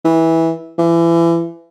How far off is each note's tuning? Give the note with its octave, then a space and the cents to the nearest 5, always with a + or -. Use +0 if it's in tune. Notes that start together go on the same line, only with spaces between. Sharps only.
E3 -15
E3 +30